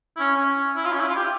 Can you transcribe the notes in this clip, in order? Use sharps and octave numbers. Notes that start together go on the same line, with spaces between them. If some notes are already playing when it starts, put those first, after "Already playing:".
E4
C#4
C#4
E4
F4
C#4
E4
F4
G4